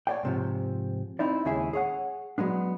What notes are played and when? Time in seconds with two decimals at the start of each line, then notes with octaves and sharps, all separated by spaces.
0.07 C#5 D5 G5
0.23 G#2 C3 F3
1.19 C4 D#4 E4 D5
1.45 D#2 C#3 G#3 E4 G#4 E5
1.73 G#4 C#5 F#5
2.38 F#3 G#3 B3 D4